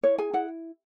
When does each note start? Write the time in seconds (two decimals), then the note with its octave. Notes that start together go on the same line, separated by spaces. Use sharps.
0.03 E4 C#5
0.18 G#4 G#5
0.33 E4 F#5